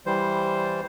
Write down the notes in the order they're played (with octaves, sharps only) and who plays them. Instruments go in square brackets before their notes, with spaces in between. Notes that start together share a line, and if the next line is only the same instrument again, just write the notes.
[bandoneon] E3 G3 C5